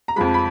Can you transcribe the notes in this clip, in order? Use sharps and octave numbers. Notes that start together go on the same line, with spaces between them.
A#5
F2 F3 G#3 B5
B5